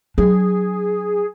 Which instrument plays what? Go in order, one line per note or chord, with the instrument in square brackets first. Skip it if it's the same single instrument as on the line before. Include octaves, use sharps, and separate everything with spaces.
[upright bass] F#3 D4 [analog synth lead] G#4